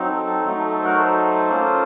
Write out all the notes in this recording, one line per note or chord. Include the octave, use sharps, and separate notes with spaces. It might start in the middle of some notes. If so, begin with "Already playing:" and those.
Already playing: F#3 C4 D#4
A4
A4
F#3 A3 D#4
A4
A4
C5
F#4 A#4
A4 C5
A#3 C#4 F4